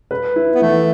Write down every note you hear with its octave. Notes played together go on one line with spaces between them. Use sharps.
B4
E4
B3
E3 A3